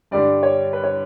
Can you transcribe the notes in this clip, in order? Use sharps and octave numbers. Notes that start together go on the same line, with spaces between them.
G2 D3 G3 D4 D5
C#5
B4
C#5